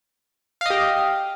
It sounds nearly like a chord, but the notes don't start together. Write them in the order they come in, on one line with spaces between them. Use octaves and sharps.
F5 D#5 G4